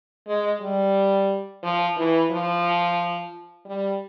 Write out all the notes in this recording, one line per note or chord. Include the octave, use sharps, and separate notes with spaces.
G#3
G3
F3
E3
F3
G3